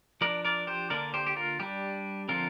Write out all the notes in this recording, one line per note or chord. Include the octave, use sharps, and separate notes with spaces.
F3 D4 A#4 D5
A#4 D5
G4 C5
D3 A#3 D4 A#4 D5
G4 C5
G4
F4 A#4
G3 D4 G4
D3 F3 C4 F4 A#4